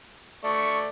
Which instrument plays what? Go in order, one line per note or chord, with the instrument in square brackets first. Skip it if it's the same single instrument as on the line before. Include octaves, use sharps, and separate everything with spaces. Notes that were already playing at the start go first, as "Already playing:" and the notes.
[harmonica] A3 D5 [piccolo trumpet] C#6